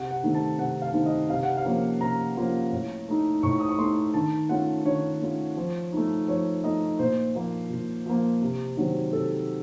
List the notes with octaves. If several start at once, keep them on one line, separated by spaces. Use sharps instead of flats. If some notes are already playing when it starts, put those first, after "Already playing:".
Already playing: C3 F#5
F#5
D#3 A3 C4 D#4
A5
C3 F#5
F5
D#3 A3 C4 D#4
D#5
C3 F5
F#5
F5
F3 A#3 C#4 F4
C3 A#5
F3 A#3 C#4 F4
A2
A3 D#4
A2 C#6
D#6
C#6
A3 D#4 C6
D#3 A5
A3 C#4 F4 F#5
D#3 C#5
A3 C#4 F4
F3
A3 D#4
F3 C#5
A3 D#4 D#5
A#2 C5
F3 A#3
A#2
F3 A#3
C3
D#3 F#3 C4
C3 A4